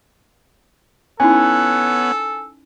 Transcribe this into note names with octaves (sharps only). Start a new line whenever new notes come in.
B3 C#4 D#4 E4 A4 C#5 F#5 G#5